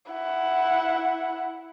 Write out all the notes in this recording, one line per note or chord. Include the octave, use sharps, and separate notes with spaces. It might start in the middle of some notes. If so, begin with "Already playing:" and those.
E4 F#5